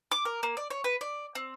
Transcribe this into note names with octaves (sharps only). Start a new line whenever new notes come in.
D6
A#4
A#3
D5
C#5
B4
D5
C4